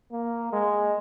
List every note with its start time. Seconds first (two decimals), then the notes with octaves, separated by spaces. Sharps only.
0.12 A#3
0.53 G#3